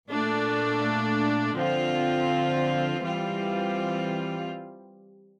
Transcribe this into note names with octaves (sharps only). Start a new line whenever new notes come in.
A#2 A3 D4
D3 F3 C4 F4
E3 G3 C4 F4